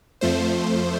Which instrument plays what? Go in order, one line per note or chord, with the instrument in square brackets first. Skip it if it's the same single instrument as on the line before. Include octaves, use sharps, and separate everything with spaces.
[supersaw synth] F2 F3 A3 C5